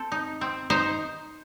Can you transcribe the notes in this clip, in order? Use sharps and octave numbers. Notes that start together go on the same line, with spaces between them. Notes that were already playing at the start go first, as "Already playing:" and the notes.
Already playing: C4 A4
D#4
C4
D#4 C5